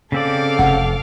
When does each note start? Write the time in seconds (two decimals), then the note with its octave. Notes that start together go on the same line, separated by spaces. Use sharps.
0.12 C#3 C4 A4 D5 F5 D6
0.59 F1 F#5